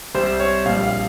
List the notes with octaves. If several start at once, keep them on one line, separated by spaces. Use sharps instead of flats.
C2 C3 G3 C5
C#5
A#1 A#2 G3 F5
F5